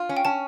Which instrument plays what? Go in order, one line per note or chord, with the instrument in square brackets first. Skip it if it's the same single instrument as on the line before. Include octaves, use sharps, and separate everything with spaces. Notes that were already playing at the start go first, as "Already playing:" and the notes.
Already playing: [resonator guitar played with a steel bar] F4
C#4
[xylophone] G5
[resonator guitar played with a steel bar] C#4 [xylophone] A5